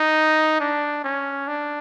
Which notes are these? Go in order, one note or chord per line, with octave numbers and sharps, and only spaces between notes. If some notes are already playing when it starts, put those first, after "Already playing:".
Already playing: D#4
D4
C#4
D4